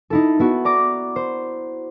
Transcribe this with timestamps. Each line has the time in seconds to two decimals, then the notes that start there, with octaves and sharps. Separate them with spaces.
0.10 D#4 E4 A4
0.39 B3 E4 F#4
0.65 D5 A#5 D6 A#6
1.16 C5